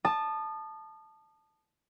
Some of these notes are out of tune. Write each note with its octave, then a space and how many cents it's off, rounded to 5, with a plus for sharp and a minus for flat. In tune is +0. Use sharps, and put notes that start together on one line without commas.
A5 +0 D#6 -30